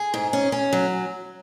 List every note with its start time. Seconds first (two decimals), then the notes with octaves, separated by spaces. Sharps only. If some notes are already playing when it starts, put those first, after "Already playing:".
Already playing: G#4
0.14 G#2
0.33 C#4
0.52 C#4
0.73 F#3